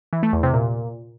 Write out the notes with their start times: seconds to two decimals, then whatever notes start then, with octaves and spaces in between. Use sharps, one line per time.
0.13 E3
0.23 A3
0.33 E2
0.43 C3
0.53 A#2